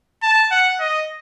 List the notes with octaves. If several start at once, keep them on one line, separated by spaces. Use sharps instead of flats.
A5
F#5
D#5